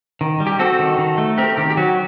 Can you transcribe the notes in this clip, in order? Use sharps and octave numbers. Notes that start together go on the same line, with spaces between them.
D#3
G3
G4
C4 F#4 A4
D#3
D#3
A3
C4 G4 A#4
D#3 G4
G4
F#3 F#4